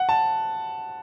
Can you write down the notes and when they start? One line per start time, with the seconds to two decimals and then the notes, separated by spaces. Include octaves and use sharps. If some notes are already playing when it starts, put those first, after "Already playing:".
Already playing: F#5
0.09 A5